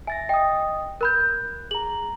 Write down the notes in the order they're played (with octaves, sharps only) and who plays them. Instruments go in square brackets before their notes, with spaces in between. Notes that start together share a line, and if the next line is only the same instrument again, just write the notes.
[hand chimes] E5 A6 A#6 [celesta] G#5
[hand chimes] D#5 D#6 [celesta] G5
[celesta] A#4 B5 G6 [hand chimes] F#6
[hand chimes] G#4 A#5 [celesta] F#7